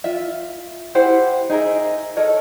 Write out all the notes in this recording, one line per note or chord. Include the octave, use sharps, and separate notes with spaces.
F4 E5
E4 G4 C5 F#5
D#4 G#4 A#4 E5
A4 A#4 C#5 D#5